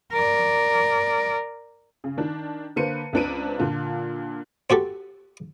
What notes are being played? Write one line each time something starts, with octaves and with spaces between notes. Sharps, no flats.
A#4 D5
C#3
D#3 D4
D3 A#3 B4 C5 C#7 D#7
C#2 C4 D4 B4 D7 D#7
A#2 D3 F4
C4 F#4 G4 A4